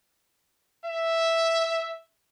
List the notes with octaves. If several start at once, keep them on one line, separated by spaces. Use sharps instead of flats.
E5